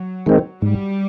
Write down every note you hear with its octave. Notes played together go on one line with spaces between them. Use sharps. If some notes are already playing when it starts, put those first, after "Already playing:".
Already playing: F#3
D#3 G#3 C4
G#2 G3